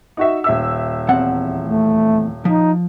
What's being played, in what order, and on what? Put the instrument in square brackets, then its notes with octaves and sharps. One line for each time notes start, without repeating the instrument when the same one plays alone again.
[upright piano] D#4 F#4 E5
D#1 E5 E6
[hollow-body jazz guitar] E2 C4 F#5
[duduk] A3
[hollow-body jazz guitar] F3 [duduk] D#4